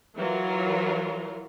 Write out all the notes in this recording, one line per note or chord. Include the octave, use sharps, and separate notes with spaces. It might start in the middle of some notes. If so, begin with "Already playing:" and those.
E3 F#3 F4 A#4